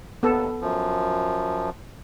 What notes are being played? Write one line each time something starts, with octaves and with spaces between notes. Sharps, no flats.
D#2 B3 A4
F#2 F3